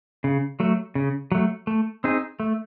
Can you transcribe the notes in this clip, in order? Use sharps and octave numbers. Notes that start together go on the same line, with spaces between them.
C#3
F#3 A3
C#3
F#3 A3
A3
C4 D#4 G#4
A3